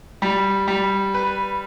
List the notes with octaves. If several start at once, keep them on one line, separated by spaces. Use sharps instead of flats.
G3
G3
B4